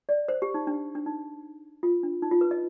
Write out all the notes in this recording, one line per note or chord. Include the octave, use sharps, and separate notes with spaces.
D5
C5
G4
D#4
D4
D4
D#4
F4
D4
D#4
F4
B4
D#5